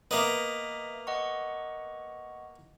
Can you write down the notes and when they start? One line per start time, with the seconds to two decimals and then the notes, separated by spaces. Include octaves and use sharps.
0.11 A#3 B3 D#5 E5
1.07 D#5 F#5 C#6